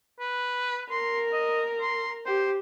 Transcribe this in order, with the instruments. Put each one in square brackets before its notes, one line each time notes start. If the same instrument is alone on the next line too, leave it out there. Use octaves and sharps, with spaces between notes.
[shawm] B4
[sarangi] A#4 [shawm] C6
[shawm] D#5
C6
[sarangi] G4 [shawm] C5